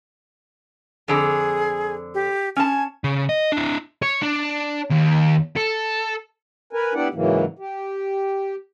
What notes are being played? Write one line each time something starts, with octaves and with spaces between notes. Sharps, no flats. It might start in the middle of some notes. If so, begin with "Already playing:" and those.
F2 D3 G#4 A#5
G4
C#4 G#5 A5
C#3
D#5
D4 E4
C#5
D4
D#2
A4
A#4 B4 G#5
B3 D4 E4 G4 D5 F#5
G#2 C#3 E3 F#3 A#3
G4